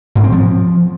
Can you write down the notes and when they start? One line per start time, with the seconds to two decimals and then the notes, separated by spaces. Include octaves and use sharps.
0.15 G#2
0.24 C4
0.32 F3